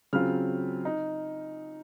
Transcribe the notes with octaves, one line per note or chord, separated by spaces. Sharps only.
C#3 F#3 C4 F4 F6
D#4